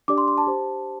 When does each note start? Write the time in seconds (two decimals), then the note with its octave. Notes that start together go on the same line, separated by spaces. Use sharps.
0.08 D4 G4 D5 D6
0.18 C6
0.28 C6
0.38 A5
0.47 G4 C5